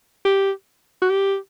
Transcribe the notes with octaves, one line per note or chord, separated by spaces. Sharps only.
G4
F#4
G4